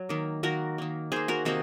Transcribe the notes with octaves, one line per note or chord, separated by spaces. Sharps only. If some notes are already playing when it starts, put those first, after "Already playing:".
Already playing: F#3
D#3 A#3
D#3 A#3 F#4 A#4
D#3 A#3
D#3 A#3 G#4 C5
F#4 A#4
C3 D#3 A#3 D#4 F#4